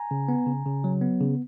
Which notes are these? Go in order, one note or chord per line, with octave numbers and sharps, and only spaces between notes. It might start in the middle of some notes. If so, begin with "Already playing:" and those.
Already playing: G#5 A#5
C#3
B3
C#3
C#3
F#3
B3
C#3